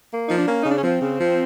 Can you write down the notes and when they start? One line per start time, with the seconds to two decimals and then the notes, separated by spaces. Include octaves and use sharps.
0.11 A#3
0.28 F3 D#4
0.38 D4
0.47 A#3 C#4
0.62 D#4
0.66 C#3 D4
0.76 C#4
0.83 F3 C4
1.02 C#3
1.20 F3